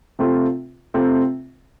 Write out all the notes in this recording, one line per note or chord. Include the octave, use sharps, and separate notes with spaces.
C3 A3 C4 F4
C3 A3 C4 F4